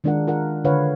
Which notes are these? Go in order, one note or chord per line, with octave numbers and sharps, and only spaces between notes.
D#3 G#3 D4 F4 A#4 F#5
F4 A#4 F#5
D3 F4 B4 C#5 F5 F#5